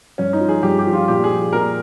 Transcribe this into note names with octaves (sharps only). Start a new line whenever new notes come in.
G2 C#4
D#4
F3
G#4
G2 G4
G4
F3
F4
A#2 G4
G#4
F3
A#2 A#4